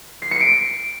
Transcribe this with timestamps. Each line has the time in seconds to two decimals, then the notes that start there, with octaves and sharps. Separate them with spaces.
0.22 C7
0.31 C#7
0.41 D7